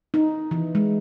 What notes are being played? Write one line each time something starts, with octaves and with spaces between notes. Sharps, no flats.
D#4
E3
G#3